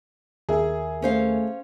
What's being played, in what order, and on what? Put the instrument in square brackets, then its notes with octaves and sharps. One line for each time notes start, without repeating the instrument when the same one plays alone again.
[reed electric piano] D#2 A#4 E5 [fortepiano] G#4
[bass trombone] A3 [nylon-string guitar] C#4 C5 F5